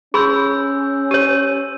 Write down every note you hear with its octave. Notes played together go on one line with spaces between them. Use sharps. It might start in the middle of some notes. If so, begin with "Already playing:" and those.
C#4 G#4 B5 C6 E6 G6
G4 C#5 D#7